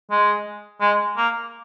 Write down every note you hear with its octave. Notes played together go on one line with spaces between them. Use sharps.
G#3
G#3
A#3